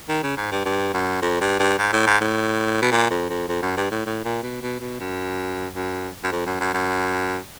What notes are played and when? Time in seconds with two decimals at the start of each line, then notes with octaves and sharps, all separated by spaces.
0.09 D#3
0.23 C#3
0.37 G#2
0.51 G2
0.65 G2
0.94 F#2
1.22 F2
1.41 G2
1.59 G2
1.78 G#2
1.93 A2
2.07 G#2
2.21 A2
2.82 B2
2.92 A#2
3.10 F2
3.29 F2
3.49 F2
3.62 F#2
3.77 G2
3.91 A2
4.06 A2
4.24 A#2
4.43 B2
4.62 B2
4.80 B2
5.00 F#2
5.75 F#2
6.24 F#2
6.32 F2
6.46 F#2
6.60 F#2
6.74 F#2